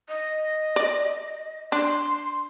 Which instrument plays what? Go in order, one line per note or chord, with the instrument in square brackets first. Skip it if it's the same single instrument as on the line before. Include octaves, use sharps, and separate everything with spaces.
[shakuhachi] D#5
[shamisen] D5
[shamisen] D4 [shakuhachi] C6